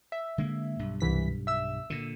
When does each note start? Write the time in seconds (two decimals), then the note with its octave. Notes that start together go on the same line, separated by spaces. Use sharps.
0.12 E5
0.38 D3 G#3 A#3
0.79 B1 G2
1.00 C2 E3 B6
1.47 E5 E6
1.90 A#2 D3